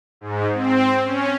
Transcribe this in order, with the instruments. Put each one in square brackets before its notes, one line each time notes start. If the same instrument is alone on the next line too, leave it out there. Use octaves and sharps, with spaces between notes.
[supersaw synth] G#2
C4
C#4